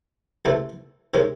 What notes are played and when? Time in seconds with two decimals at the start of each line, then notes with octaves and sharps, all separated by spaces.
0.45 C#2 C3 E3 A3
1.14 C3 D#3 G#3 C#4